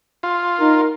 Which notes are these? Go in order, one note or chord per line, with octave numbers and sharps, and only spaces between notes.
F4
D#4 A#4